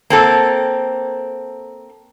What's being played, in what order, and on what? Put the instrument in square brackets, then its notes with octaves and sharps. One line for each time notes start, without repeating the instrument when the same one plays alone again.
[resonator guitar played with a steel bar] A#3 C4 A4